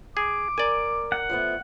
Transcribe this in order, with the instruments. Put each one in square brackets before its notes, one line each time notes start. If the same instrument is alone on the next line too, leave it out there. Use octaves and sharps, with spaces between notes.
[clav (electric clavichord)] G#4 [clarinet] D6
[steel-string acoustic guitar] A#4 [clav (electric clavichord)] D5 G#5
[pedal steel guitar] F#5
[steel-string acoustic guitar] F3 A3 B3